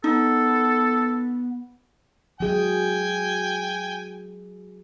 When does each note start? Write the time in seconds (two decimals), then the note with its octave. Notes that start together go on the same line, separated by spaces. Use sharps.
0.04 B3 D#4 A4
2.40 F#3 G#4 G5 G#5